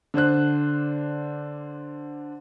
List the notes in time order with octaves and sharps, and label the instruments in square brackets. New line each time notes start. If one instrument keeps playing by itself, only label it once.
[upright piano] D3 D4 C5 F#6